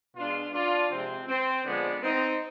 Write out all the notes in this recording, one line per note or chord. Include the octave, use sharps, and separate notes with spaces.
B2 G#3 D4 F4
D4 F4
C3 F3 G#3 C4
C4
D3 F3 G#3 B3 D4
C4 D#4